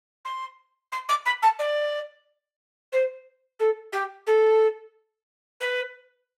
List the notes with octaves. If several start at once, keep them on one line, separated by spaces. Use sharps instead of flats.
C6
C6
D6
B5
A5
D5
C5
A4
G4
A4
B4